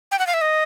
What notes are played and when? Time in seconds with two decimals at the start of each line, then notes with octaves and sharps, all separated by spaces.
0.11 G5
0.19 F#5
0.27 F5
0.34 E5
0.41 D#5